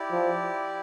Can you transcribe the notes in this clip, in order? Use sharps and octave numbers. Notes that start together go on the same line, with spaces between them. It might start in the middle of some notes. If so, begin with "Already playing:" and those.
Already playing: E4 G4 D5
F3